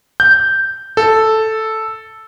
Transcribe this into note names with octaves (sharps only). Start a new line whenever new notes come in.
G6
A4